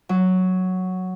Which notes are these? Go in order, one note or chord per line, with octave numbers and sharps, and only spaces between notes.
F#3